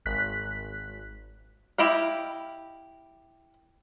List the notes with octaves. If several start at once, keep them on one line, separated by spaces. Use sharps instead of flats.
G#1 F#6 B6
E4 G4 D#5 F5